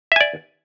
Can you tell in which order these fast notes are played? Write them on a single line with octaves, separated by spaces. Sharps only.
E5 G#5 D5